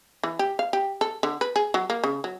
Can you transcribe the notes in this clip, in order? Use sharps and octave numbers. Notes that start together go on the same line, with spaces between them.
E3
G4
F5
G4
A4
D3
B4
G#4
F#3
A#3
C#3
F#3